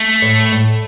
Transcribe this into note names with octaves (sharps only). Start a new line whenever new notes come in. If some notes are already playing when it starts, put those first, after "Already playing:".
Already playing: A3
A2
A2